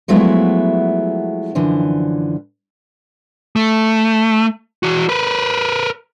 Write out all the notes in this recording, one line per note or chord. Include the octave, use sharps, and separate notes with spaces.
F3 F#3 G#3 A3 B3 E4
F#2 D3 E3 F3
A3
E3 F#4
A#4 B4